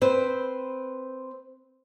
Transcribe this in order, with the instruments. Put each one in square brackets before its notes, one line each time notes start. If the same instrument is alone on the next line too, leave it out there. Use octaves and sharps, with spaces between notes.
[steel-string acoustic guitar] C4 B4 C5